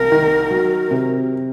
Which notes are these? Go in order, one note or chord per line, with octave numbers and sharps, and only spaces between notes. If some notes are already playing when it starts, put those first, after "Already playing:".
Already playing: C2 A#4
D#3
F#3
C3